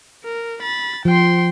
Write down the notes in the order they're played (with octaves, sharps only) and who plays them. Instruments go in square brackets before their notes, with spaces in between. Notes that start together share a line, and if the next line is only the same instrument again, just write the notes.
[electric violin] A#4
B5 A6
[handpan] F3 [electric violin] G5 C6